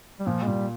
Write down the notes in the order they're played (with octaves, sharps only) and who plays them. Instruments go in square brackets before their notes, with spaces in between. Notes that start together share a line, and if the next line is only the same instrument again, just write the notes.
[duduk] G3
[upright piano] A#2 [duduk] F3
[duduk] G#3
[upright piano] A#2 [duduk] G3